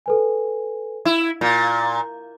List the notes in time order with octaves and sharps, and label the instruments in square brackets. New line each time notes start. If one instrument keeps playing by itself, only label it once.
[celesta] A4 B4 G#5
[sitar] E4
[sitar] A#2 [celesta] G6